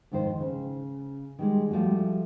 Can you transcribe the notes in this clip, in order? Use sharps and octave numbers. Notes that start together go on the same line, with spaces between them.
F2 G#2 D#3 F4 C5
C#3
D#3 G3 G#3
F3 G3 A3 F#4